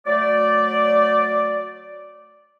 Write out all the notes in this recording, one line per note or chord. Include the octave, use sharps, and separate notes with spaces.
F#3 A3 D5